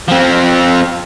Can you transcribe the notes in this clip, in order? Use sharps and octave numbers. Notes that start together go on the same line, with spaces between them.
F3 C4